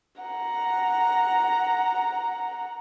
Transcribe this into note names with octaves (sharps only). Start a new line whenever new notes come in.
F#5 A#5